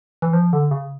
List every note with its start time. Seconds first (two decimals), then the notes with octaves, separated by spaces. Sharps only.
0.22 E3
0.33 F3
0.53 D3
0.71 C#3